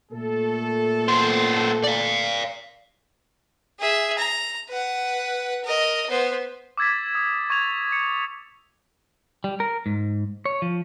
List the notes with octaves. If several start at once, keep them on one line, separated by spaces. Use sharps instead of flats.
A#2 A3 A4
B3 C5
D5 F5
G#4 E5
A#5
B4 F#5
A#4 D#5
B3 C5
D6 E6 G#6 A6 B6
D#6
C#6 G#6 A6 F7
C#7
G3
A#4
G#2
C#5
F3